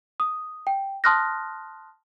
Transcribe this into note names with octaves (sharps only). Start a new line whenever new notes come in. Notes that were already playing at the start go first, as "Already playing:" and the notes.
D#6
G5
A5 C6 D#6 F6 F#6 A#6